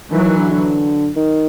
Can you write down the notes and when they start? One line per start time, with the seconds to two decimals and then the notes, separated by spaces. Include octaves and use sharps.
0.11 D#3 E3 F#3
0.24 D#3
0.37 D3
0.50 D3
1.16 D#3